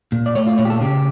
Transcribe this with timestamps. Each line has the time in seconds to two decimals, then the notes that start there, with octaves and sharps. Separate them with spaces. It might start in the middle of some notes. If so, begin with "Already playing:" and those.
0.12 A#2
0.26 D5
0.35 A3 C#5
0.47 F4
0.58 A#2 C#5
0.65 G4
0.70 A4
0.81 C#3 G4